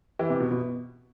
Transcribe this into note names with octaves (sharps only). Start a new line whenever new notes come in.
E3
C3
B2
B2